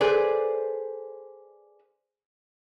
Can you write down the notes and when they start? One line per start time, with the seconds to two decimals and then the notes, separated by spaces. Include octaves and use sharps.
0.01 G#4 A4 B4 C5 D5